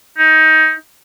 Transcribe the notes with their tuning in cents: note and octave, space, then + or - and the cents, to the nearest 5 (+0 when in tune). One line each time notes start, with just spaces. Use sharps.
D#4 +20